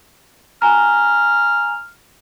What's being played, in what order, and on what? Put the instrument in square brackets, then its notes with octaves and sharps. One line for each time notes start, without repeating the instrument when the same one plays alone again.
[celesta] G#5 A#5 [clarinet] F6